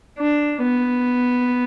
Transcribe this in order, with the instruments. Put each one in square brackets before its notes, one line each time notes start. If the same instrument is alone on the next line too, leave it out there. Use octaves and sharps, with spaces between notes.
[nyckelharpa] D4
B3